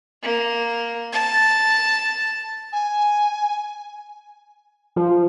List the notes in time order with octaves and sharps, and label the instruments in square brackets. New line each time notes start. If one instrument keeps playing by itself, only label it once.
[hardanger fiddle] A#3
A5
[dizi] G#5
[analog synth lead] F3